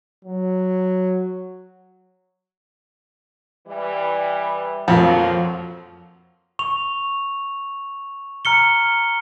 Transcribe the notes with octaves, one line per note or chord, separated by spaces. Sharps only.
F#3
E3 G3
F2 F3 F#3 A#3
C#6 F7
A#5 F6 C#7 G7